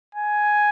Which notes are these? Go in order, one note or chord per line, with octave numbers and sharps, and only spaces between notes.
G#5